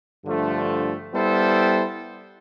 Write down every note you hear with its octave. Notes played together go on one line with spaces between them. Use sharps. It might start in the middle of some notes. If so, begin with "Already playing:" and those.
G2 D3 F3 A3
G3 B3 E4 A4 C5